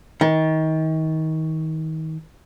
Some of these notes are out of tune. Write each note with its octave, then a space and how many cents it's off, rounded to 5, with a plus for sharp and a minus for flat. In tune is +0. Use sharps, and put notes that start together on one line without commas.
D#3 +30